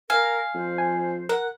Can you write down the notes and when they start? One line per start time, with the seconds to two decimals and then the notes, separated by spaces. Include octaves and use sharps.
0.10 A#4 F5 G#5
0.54 F2 C5
0.78 G#5
1.29 A#4 F#5